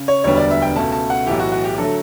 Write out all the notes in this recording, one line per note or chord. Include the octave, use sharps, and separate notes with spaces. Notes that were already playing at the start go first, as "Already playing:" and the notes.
Already playing: C#3
C#5
E1 D2 D3 G3 B3 C#5
D5
E5
G5
C#2 B2 A3 A5
A5
F#5
B1 A2 E3 G4
F#4
F#4
G4
D3 F#3 A3 A4